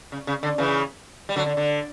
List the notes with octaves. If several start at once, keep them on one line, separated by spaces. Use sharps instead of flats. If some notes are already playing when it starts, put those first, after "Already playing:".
C#3
C#3
D3
C#3 E3
G3
D3 F#3
D3
D3